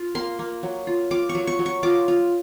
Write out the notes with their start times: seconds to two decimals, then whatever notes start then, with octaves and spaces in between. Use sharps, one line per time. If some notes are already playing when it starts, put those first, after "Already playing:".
Already playing: F4
0.15 A#3 C6
0.39 A#3
0.63 F#3
0.87 F4
1.11 F4 D6
1.29 C#6
1.35 F#3
1.47 C#6
1.59 F#3
1.66 C#6
1.83 F4 D6
2.08 F4